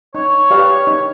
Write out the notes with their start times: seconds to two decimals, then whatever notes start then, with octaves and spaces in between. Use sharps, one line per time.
0.15 D#4 C#5
0.51 G4 B4 D5 F5
0.87 D#4